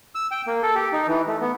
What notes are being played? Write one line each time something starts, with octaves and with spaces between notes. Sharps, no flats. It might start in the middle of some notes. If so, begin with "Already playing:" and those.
E6
G5
A#3
A4
G4
D#4
E3
A3
B3